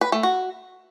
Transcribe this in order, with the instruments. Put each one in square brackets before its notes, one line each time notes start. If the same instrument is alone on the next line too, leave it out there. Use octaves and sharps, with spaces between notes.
[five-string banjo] B4
A3
F#4